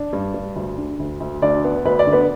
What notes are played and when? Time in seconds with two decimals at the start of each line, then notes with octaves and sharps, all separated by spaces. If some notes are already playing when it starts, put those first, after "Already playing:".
Already playing: D4
0.13 G2
0.34 G2
0.56 D2
0.78 D3
0.99 D2
1.20 D2
1.42 D2 D4 D5
1.64 B3
1.85 D2 B4
1.99 D5
2.07 D3
2.12 B3 B4